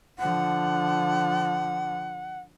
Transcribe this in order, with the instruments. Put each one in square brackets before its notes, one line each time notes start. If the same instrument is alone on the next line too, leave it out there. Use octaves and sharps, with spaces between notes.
[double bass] D3 F3 [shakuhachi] F#5